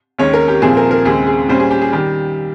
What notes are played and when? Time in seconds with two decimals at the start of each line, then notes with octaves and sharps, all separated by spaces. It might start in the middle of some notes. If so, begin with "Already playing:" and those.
0.19 D#2 D#3 G#3 C#4 C#5
0.33 A#4
0.48 G4
0.62 C2 A#2 F3 C4 G#4
0.77 A#4
0.91 A#4
1.05 D#2 C#3 G#3 C4 G#4
1.27 G#4
1.49 A#2 G3 C#4 C5
1.60 G#4
1.71 G4
1.82 G#4
1.93 D#3 G3 G4